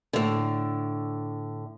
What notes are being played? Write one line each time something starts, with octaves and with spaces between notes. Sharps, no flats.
A2 D3